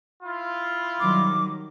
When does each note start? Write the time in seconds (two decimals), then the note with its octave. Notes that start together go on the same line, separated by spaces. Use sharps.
0.23 E4 F4
1.00 D#3 F#3 G3 D6